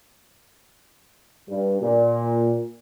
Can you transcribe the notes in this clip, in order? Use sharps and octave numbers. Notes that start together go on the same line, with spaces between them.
G2
A#2